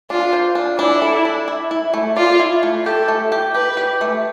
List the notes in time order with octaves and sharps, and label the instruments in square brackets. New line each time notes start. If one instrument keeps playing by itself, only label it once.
[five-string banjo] D4 [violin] F4
[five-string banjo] C5
D4
[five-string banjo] D4 [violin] E4
[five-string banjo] A4
D4
E4
E4
A3
[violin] F4 [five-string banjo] D5
[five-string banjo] E4
A3
[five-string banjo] G4 [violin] A4
[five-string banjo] A3
G4
[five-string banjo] G4 [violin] B4
[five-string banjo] G4
A3